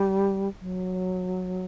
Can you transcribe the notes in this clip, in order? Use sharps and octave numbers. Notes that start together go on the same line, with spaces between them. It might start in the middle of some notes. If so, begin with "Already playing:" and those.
Already playing: G3
F#3